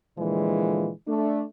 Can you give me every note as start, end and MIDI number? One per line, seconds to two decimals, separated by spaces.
0.18 0.90 46
0.18 0.90 50
0.18 0.90 52
0.18 0.90 53
0.18 0.90 56
1.08 1.42 57
1.08 1.42 62